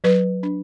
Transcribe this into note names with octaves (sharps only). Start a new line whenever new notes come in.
F#3 B4
D4